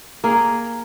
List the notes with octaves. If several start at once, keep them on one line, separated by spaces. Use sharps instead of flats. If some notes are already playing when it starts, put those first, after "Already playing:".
A#3 G#4 A#4